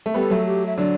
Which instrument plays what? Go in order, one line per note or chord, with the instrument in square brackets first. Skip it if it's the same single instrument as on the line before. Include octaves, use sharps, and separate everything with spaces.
[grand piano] A3
[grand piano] G3 B3 [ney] A4
[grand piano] F#3 A3
[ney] G4
E5
[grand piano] D3 F#3 [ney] D5